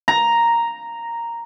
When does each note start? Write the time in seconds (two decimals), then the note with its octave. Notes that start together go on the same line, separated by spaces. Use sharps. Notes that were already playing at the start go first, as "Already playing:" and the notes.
0.08 A#5